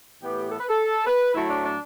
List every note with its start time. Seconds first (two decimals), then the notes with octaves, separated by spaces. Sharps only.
0.21 A2 E3 B3 G4
0.50 A4
0.59 B4
0.69 A4
1.06 B4
1.35 A2 F#3 A3 E4
1.49 D4
1.63 D4